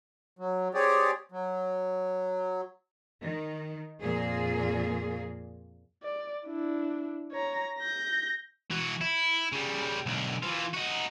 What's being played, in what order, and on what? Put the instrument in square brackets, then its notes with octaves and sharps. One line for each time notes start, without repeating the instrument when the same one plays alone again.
[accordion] F#3
C4 G4 G#4 C#5 D5
F#3
[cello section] D#3
F2 A#2 A#3 G#4
[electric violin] D5
D4 E4
C#5 A#5
G6 A#6
[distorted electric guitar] E3 F#4
E4
C#3 G3
B1 D3
E3 F4
D#4 F#4